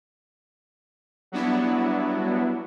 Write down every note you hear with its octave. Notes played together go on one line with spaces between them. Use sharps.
F#3 G3 B3 D4 E4 F#4